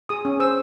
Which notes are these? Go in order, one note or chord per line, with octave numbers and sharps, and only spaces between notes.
G#4 D#6
C#4
C5 E6